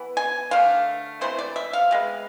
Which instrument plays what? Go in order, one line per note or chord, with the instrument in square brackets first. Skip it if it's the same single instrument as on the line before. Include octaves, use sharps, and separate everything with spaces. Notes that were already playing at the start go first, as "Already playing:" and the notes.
Already playing: [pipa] E3 B3
G#5
D3 A3 F5
C3 E3 A3 C5
D5
E5
F5
C3 G#3 B3